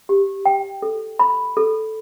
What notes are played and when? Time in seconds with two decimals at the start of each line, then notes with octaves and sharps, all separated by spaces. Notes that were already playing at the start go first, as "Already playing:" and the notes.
0.09 G4
0.45 G5
0.82 A4
1.19 B5
1.57 A4